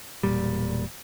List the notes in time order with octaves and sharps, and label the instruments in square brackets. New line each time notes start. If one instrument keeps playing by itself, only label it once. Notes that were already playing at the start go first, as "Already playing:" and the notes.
[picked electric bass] E1 A#2 G3